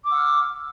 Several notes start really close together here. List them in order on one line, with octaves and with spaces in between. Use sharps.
D6 E6 F#5 F6